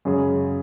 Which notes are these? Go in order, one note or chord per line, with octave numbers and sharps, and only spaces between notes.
F#2 C#3 G#3 C#4 G#4